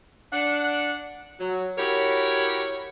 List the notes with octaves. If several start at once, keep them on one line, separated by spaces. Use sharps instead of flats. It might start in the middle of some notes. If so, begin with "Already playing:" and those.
D4 F#5
F#3
E4 F#4 G4 A#4 C#5